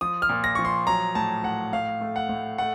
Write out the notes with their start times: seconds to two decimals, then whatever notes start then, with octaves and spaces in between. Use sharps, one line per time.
0.01 F3 D#6
0.22 F6
0.29 A#2
0.44 A#6
0.55 F3 C#6
0.65 C6
0.87 F#3 A#5
1.15 A2 A5
1.44 A2 F#5
1.73 A2 F5
2.01 A3
2.16 F#5
2.29 A2
2.58 A3 F#5